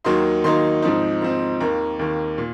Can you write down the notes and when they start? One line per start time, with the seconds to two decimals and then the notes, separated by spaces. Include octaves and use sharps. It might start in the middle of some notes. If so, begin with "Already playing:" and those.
0.04 D#2 D#3 F#3 A#3 D#4 C6
0.44 D#2 D#3 F#3 A#3 D#4 C6
0.82 G#2 F3 C4 D#4
1.22 G#2 F3 C4 D#4
1.60 D#2 D#3 A#3 A#5
1.99 D#2 D#3 A#3
2.38 A#2